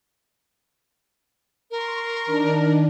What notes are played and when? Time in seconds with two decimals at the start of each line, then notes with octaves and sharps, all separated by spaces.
1.71 A#4 C6 C#6
2.26 D#3 D4